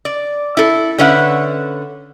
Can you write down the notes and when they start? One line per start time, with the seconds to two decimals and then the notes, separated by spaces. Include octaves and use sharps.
0.05 D5
0.57 E4 A4
0.98 D3 C#4 B4 C#5 E5 F#5